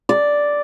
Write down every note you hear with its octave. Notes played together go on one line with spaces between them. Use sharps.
D5